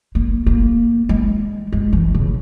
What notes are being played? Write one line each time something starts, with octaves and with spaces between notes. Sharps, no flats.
A#3
A#3
G#3
G#3
E3
C#3